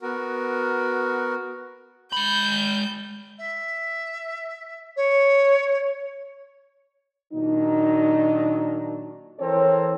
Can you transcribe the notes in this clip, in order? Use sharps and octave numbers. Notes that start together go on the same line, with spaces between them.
B3 F#4 A#4
G#3 B5 G6
E5
C#5
A#2 D#3 F#3 D4 D#4
E3 C4 A4 A#4 C5 C#5